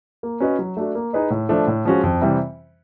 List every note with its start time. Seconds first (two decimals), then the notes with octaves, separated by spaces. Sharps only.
0.23 A#3
0.40 C#4 F#4 B4 D#5
0.59 F#3
0.77 A3 D4 F#4
0.95 A#3
1.13 D#4 G#4 B4 D#5
1.30 A2
1.49 F3 A3 D4
1.67 A2
1.85 F3 G#3 C#4 F#4
2.04 F2
2.21 C3 E3 G3